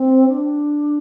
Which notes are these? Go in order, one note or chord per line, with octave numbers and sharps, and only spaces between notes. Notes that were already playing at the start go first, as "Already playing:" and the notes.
Already playing: C4
D4